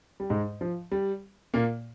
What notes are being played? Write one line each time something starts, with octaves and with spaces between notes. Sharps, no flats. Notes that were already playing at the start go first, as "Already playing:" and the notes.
G3
G#2 G#3
F3
G3
A#2 A#3